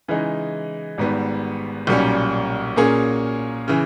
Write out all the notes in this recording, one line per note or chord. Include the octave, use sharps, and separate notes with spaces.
C#3 E3 G#3 D#4
G#1 G#2 G3 B3
B1 A#2 G3 C#4
A#2 A#3 C#4 G#4
C#3 E3